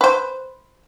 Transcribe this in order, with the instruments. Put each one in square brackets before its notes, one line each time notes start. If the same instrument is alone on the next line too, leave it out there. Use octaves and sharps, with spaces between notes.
[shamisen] B4 C5